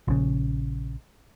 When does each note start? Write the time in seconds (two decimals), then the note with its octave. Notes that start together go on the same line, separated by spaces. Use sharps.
0.08 A#1 C#3